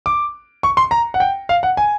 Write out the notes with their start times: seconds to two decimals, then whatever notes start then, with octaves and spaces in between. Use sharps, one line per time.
0.06 D6
0.63 C#6
0.77 C6
0.91 A#5
1.14 F#5
1.20 G5
1.49 F5
1.63 F#5
1.77 G#5